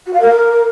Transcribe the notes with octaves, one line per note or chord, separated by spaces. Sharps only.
F#4
F5
A#4